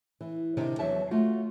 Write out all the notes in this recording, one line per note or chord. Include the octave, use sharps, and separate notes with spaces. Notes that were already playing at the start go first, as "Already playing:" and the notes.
E3
C3 D#3 D4
E2 F#3 E5 A5
A3 F4 F#4